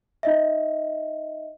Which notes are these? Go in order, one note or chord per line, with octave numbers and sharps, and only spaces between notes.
D#4 D#5 E5